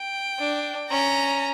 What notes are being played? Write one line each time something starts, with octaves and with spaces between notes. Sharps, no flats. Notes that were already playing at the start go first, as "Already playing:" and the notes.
Already playing: G5
D4
C#4 A#5